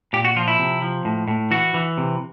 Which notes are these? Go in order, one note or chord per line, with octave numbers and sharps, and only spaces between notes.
A#2 G4
F#4
F3 F4
E4
C3
F3
A2
A2
E3 F#4
E3
C3